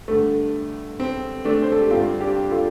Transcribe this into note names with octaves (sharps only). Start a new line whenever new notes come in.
G2 D3 A3
C4
A3 D4
C5
A4
G4
G2 D3 C4 F4
D4 G4
F4 A4